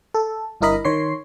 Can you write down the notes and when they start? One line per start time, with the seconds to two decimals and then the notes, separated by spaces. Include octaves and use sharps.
0.14 A4
0.61 G1 G2 E4 A#4 D#5 B5
0.85 D#3 C#5 C6 C7